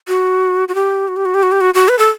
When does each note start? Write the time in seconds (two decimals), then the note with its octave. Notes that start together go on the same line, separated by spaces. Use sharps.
0.08 F#4
0.68 F#4
0.75 G4
1.08 F#4
1.16 G4
1.25 F#4
1.34 G4
1.43 F#4
1.52 G4
1.61 F#4
1.74 F#4
1.88 B4
1.99 A4